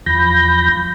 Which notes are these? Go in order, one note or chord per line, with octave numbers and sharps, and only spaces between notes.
E2 F3 B5 G6 A#6